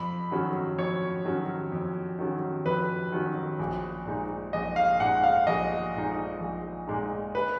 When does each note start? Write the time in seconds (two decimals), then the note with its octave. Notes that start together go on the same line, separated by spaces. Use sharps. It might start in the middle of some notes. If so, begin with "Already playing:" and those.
Already playing: F2 B5
0.31 D#3 F#3 C#4
0.78 F2 C#5
1.25 D#3 F#3 C#4
1.72 F2
2.19 D#3 F#3 C#4
2.65 F2 B4
3.12 D#3 F#3 C#4
3.59 A#1
4.06 A#2 G#3 D#4
4.53 A#1 D#5
4.76 F5
5.00 A#2 G#3 D#4 F#5
5.23 F5
5.47 A#1 D#5
5.94 A#2 G#3 D#4
6.40 A#1
6.87 A#2 G#3 D#4
7.35 B4